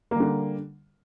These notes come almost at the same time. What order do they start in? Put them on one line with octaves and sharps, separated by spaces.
A#3 G3 D3